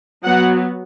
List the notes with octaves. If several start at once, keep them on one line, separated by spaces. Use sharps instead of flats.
F#3 B3 F#5